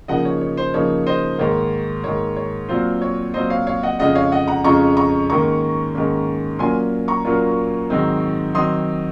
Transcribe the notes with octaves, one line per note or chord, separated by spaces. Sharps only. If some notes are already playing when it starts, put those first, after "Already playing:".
C#3 F3 A#3 D#4 D#5 F#5
C#5
C#5
C5
C#3 F3 A#3 D#4 C#5
C5 D#5
G#2 D#3 A#3 C#5
G#2 D#3 A#3 C#5
C#5
A#2 F#3 C4 F4 C5
C#5
A#2 F#3 C4 F4 C5 D#5
C#5 F5
C#5 F5
D#5 F#5
F2 C#3 G#3 C#4 F4 D#5 F#5
C#5 F5
D#5 F#5
F#5 A#5
F2 C#3 G#3 C#4 F4 A#5 C#6
A#5 C#6
G#2 D#3 A#3 C#4 A#5 C#6
G#2 D#3 A#3 C#4
A#2 F#3 A#3 C#4 F4 G#5 C6
A#5 C#6
A#2 F#3 A#3 C#4 F4
G#2 D#3 F#3 C4 D#4
D#3 F#3 C4 D#4 C6 D#6